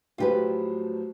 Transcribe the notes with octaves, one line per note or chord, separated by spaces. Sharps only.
A2 F3 F#3 F4 G4 B4